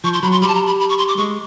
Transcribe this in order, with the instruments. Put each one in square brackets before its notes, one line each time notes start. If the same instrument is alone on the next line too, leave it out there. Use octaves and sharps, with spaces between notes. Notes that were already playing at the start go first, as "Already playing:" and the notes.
[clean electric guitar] F3 [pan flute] C#6
[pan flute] C6
[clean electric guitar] F#3 [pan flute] B5
[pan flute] C6
[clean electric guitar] G3 [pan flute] B5
[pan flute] A5
A#5
B5
B5
C#6
C6
D6
[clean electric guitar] G#3 [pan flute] C#6